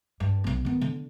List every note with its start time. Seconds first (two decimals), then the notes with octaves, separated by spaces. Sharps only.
0.20 G2
0.44 B1 B3
0.65 D#3 B3
0.81 D3